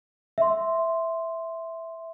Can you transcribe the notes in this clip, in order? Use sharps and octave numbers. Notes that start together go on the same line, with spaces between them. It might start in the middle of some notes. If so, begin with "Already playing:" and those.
E5 C6